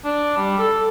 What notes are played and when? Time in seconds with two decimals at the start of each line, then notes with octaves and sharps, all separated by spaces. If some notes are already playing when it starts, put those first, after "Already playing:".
0.05 D4
0.37 G3
0.59 A4